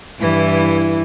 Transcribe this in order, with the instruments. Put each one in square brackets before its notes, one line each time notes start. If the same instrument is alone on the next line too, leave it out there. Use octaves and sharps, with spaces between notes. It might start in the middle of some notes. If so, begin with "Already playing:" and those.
[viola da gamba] G2 E3 E4